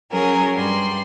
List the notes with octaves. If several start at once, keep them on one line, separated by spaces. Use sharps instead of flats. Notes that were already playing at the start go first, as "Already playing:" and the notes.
F#3 C#4 G#4 A#4
G2 G3 C6